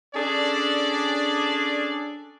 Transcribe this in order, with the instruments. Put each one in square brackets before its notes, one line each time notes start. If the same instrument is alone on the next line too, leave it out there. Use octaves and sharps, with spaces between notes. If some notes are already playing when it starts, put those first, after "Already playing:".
[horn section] C#4 D4 G#4 A4 D5